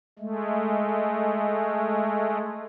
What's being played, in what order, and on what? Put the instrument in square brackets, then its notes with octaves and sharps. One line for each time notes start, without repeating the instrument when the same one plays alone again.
[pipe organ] G#3 A3